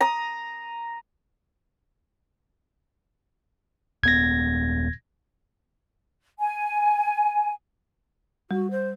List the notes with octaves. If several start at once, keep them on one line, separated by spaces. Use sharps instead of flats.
A#5 D#6
D#1 B3 G#6 A#6
G#5
G3 F#4
C5